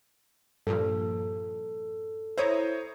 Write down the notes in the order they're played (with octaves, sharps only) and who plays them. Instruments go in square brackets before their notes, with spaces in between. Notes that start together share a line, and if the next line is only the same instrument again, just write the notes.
[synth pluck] G2 A#2 F3 [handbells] A4
[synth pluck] E4 A#5 D#6 [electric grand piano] C5 C#5